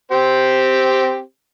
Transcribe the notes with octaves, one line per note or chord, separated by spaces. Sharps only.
C4 G4 C5